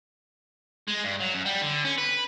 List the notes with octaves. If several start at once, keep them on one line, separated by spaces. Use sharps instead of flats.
G#3
G2
F#3
F#2
G3
D3
C#4
B4